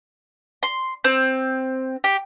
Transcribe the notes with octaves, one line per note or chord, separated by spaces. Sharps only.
C6
C4
G4